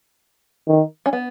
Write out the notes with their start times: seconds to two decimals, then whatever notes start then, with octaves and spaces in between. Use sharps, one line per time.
0.68 D#3
1.06 C#4
1.13 B3